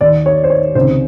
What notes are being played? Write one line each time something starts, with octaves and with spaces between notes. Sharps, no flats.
D#2 D#3 D5
C#5
C5
C#5
C#2 C3 D#3 C5